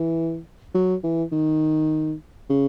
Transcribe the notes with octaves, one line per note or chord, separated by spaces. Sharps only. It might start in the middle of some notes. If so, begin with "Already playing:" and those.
Already playing: E3
F#3
E3
D#3
C#3